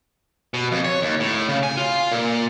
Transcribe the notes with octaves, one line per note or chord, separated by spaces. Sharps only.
B2
F2
C#5
D#2
A2
C#3
G#5
F4
A#2